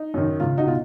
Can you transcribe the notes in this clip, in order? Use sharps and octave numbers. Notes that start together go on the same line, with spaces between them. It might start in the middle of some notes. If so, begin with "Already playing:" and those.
Already playing: D#4
F#2 D#3
C#2 F4
D#4 F#4
B2 F4